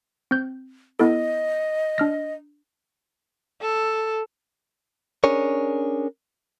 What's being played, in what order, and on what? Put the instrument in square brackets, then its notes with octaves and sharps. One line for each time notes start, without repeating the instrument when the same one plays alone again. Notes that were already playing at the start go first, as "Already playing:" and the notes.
[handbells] C4 G6
[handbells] B3 E4 A4 [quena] D#5
[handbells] D4 F6 A#6
[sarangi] A4
[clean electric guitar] C#4 D4 G#4 A#4 C#5